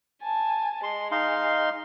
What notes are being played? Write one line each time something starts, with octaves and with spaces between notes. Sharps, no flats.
G#5 A5
G#3 C6
D#4 F5 C6